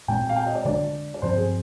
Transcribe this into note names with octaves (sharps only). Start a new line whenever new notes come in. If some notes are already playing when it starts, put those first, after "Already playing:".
A#2 G#3 C4 G5
F5
G5
D#5
D5
D3 G#3 D4 D5
D5
G2 F3 C4 C5
G#4